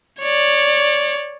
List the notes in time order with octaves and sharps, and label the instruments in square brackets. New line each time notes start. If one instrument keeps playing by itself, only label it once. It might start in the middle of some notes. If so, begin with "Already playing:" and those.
[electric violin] C#5 D5